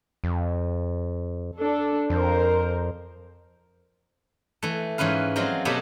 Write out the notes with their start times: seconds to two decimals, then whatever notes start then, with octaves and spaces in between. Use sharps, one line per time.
0.24 F2
1.58 D4 A4
2.10 F2 A#4 C5
4.63 E3 A3
4.98 G#2 E3 C#4 B4 F5
5.36 F3 F#3 G#3 C4 F4
5.65 B2 F#3 A3 B3 G4